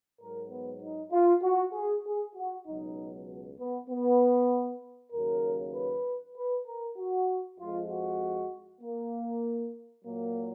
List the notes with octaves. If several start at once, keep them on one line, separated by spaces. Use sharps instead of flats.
G#2 F#3 A#4
B3
D#4
F4
F#4
G#4
G#4
F#4
C#2 B2 F#3 D#4
B3
B3
D#2 C#3 F#3 A#4
B4
B4
A#4
F#4
F2 F3 G#3 F4
F#4
A#3
A#2 F#3 A#3